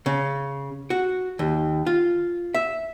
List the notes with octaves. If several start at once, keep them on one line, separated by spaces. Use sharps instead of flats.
C#3
F#4
D#2
F4
E5